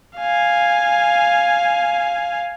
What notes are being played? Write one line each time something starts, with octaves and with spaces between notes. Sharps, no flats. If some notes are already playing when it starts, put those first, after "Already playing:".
F5 G#5